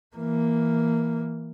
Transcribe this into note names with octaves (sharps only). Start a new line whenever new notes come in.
E3 A#3